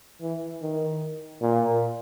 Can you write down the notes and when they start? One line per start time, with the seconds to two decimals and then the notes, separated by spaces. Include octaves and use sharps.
0.21 E3
0.62 D#3
1.41 A#2